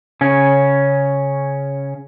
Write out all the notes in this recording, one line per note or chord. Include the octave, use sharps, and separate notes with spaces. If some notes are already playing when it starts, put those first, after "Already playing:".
C#3 C#4